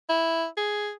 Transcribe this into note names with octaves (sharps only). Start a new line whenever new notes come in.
E4
G#4